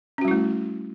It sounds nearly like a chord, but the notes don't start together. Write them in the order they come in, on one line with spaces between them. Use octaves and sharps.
C#4 F#4 G3 E4 A3